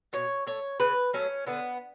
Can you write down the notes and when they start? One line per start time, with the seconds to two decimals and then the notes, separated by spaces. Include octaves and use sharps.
0.13 B2 C#5
0.47 A3 C#5
0.80 C#3 B4
1.14 F#3 A3 C#4
1.47 D3 B3